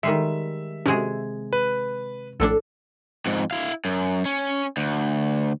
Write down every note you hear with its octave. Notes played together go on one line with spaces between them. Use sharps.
D#3 G3 G#3 E5 C7
C3 G#3 C#4 F#4 G#4
B4
A#1 A2 D4 A4
F2 G#2
E4 F5
F#2
C#4
D2